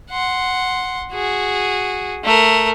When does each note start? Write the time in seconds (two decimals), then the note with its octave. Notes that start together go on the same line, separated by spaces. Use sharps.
0.11 F#5 C6
1.13 F#4 G#4
2.24 A3 A#4